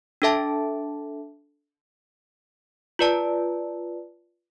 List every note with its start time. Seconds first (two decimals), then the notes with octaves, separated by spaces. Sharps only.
0.22 D4 A4 E5 A5
2.99 F4 B4 D5 A5